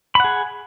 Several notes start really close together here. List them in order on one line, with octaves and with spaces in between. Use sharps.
B5 F#5 G#4